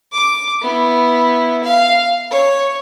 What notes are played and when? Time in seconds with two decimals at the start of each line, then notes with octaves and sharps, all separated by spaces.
0.12 D6
0.62 B3 E4
1.63 F5
2.31 C#5